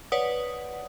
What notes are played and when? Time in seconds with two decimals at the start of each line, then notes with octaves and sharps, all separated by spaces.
0.12 B4 C#5 D5 F#5 D#6